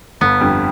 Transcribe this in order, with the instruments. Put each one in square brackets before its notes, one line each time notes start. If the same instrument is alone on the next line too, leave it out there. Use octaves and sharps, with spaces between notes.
[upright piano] G1 [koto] B3
[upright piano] F2 D3 G3